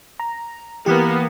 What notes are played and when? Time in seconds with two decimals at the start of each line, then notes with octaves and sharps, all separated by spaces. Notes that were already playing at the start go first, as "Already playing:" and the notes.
0.20 A#5
0.86 E3 A#3 B3 G4